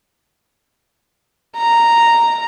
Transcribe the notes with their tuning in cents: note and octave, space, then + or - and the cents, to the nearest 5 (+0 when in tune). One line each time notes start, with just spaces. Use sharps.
A#5 -5